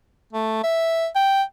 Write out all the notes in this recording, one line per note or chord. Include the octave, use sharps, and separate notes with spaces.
A3
E5
G5